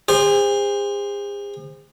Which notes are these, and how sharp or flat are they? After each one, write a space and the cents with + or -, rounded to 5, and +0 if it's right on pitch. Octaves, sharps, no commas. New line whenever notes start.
G#4 -45 C5 -5